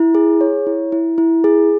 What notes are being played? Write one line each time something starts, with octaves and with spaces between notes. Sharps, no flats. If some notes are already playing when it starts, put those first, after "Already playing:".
Already playing: E4
G#4
C#5
E4
E4
E4
G#4